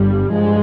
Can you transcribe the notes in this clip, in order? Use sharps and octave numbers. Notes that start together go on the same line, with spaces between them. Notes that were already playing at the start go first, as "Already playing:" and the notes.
Already playing: G1 G2 G3
G2 F3 G#3